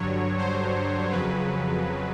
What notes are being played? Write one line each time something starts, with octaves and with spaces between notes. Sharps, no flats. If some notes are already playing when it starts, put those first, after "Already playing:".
Already playing: G2 D3 F#3 C#5
C5
F2 C#3 F#3 B4